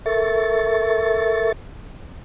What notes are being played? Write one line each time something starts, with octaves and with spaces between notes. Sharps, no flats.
A4 A#4 E5 C#6 A6